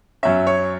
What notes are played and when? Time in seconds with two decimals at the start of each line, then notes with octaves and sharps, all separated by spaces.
0.23 F#2 F#3 C#4 E5
0.47 C#5